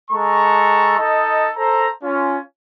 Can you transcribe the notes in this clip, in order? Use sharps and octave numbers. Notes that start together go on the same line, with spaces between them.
G#3 A4 A#5 C#6
D#4 A4 D#5
A4 C5 A#5
C#4 F4